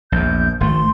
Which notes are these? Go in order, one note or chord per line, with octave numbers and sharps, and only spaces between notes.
A#1 E2 G6
G#1 A3 C6